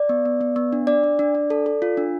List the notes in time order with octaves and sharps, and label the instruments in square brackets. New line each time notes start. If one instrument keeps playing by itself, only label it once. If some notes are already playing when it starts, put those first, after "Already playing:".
Already playing: [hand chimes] D5
B3
B3
B3
B3
D4
D4 D5
D4
D4
D4
A4
A4
F4
D4